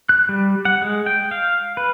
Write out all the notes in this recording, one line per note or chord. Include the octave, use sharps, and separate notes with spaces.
F#6
G3
F#5
G#3
G5
F5
B4